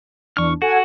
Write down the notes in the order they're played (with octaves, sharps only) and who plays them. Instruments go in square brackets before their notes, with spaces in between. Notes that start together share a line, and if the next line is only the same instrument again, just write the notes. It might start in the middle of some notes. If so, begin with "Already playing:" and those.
[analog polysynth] E2 D4 [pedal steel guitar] C#6 F6
[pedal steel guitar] F#4 [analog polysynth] A4 F#5 G#5